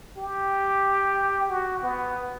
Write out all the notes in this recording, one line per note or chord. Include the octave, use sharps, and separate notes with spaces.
G4
F#4
B3